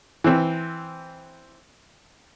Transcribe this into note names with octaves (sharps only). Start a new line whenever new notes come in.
E3 C4